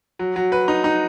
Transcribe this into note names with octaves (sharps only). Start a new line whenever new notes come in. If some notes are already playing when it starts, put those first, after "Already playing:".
F#3
F#3
B4
D#4
D#4